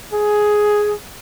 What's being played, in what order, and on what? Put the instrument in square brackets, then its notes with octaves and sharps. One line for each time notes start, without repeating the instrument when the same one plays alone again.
[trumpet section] G#4